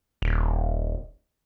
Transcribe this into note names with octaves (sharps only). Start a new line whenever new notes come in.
D#1